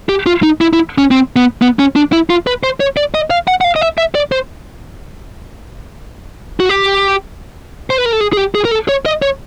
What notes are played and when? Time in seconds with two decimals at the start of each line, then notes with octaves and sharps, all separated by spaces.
0.09 G4
0.26 F4
0.43 D#4
0.61 E4
0.73 E4
0.98 C#4
1.11 C4
1.36 B3
1.62 B3
1.79 C#4
1.96 D4
2.12 E4
2.30 F4
2.47 B4
2.63 C5
2.80 C#5
2.97 D5
3.14 D#5
3.30 F5
3.48 F#5
3.61 F#5
3.64 F5
3.76 D#5
3.82 E5
3.98 E5
4.15 D5
4.32 C5
6.60 F#4
6.69 G4
7.90 C5
7.98 B4
8.05 A#4
8.13 A4
8.21 G#4
8.33 G#4
8.37 G4
8.55 G#4
8.65 A#4
8.71 A4
8.89 C#5
9.06 D#5
9.22 C#5